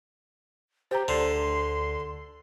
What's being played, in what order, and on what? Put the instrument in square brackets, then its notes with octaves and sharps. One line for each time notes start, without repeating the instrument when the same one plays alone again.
[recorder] G4 [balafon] C5 A#5
[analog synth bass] D2 [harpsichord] D3 [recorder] C6